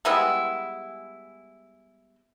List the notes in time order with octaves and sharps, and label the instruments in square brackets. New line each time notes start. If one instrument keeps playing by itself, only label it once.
[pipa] G3 G#3 B3 E4